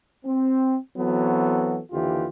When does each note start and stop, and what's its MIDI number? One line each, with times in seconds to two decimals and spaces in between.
0.25 0.75 60
0.97 1.79 52
0.97 1.79 54
0.97 1.79 59
0.97 1.79 60
0.97 1.79 66
0.97 1.79 69
1.92 2.27 39
1.92 2.27 50
1.92 2.27 52
1.92 2.27 65
1.92 2.27 67